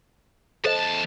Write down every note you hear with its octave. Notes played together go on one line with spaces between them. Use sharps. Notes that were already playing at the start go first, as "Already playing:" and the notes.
E2 A4 C5 D#5 A5